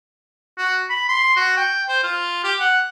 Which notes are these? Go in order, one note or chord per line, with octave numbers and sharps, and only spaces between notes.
F#4
B5
C6
F#4
G5
C5
F4
G4
F#5